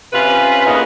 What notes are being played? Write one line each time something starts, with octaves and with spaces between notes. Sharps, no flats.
C3 C#4 F4 B4
A#3 B3 C#4 D#4 F4 G#4